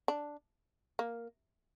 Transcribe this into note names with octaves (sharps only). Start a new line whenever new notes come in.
D4
A#3